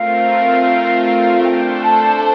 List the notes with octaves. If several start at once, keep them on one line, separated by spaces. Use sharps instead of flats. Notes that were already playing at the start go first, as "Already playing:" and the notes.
Already playing: A3 C4 F4 A#4 F5
A3 D4 A4 C5 G5
A5
A5